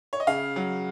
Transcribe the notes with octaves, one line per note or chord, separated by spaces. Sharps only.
C#5
D#5
C#3 F5
F#3